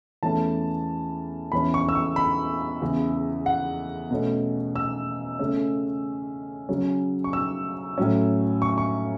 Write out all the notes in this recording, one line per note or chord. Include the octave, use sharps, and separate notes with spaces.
E2 E3 A3 C#4 A5
E2 E3 C#4 B5
C#6
E6
C#6
B5
E2 C#3 E3
F#5
B2 A3 C#4
E6
C#3 A3 C#4
C#3 F#3 C#4
C#6
E6
A2 F#3 C#4
C#6
C#6